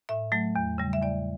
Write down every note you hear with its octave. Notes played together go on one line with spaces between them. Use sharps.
A2 E5
F#3 A3
E2
C#3 G3
E5
E2 D5